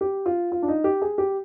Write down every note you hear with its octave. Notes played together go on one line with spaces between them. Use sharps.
G4
F4
F4
D4
D#4
G4
G#4
G4